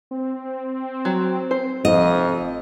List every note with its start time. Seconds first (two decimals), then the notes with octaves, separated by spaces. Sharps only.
0.11 C4
1.05 F#3
1.51 C5
1.85 F1 F2 D#5